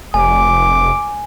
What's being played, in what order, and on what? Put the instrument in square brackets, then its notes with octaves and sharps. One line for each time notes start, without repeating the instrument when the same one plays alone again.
[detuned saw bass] F1 [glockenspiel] G#5 [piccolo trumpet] D6